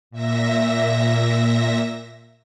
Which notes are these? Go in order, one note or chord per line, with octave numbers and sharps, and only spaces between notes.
A#2 E5 A#6